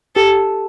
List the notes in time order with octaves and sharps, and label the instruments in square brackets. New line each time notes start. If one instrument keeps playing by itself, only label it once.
[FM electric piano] G4 [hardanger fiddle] A4